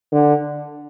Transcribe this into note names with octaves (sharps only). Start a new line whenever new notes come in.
D3